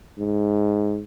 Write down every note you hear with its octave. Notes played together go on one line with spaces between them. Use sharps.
G#2